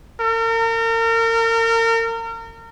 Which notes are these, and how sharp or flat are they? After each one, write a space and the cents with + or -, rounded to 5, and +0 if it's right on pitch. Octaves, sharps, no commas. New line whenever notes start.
A#4 -35